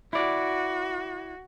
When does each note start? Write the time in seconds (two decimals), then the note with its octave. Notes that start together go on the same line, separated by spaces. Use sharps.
0.13 E4 F#4 D5